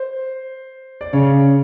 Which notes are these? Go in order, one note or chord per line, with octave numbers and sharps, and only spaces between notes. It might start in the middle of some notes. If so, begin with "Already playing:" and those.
Already playing: C5
D5
C#3 C#5